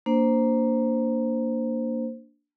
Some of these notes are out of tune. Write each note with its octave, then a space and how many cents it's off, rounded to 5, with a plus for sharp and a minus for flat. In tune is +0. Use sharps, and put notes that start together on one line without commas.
A#3 +0 D4 +0 C5 +0